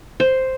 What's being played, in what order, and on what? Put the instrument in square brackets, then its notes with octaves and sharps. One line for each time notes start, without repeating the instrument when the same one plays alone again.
[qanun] C5